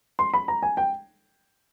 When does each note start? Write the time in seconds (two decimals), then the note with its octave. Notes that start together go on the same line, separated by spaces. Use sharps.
0.19 C6
0.34 B5
0.48 A#5
0.62 G#5
0.77 G5